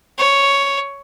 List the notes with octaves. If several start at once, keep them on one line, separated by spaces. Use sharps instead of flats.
C#5